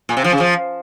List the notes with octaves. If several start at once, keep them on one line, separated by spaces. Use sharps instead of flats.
A#2
C3
F3
C#3
F3